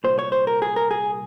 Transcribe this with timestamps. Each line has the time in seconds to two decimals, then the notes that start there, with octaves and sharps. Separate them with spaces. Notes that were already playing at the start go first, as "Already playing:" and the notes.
0.04 C2 A#2 C5
0.19 C#5
0.32 C5
0.47 A#4
0.62 G#4
0.76 A#4
0.91 G#4